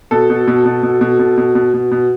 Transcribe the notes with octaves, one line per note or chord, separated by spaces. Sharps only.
B2 A4
B2
B2
B2
B2
B2
B2
B2
B2
B2
B2